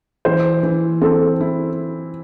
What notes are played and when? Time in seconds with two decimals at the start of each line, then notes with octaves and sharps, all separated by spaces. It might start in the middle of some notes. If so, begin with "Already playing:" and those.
0.25 E3 C5
0.63 E3
1.02 C4 A4
1.40 E4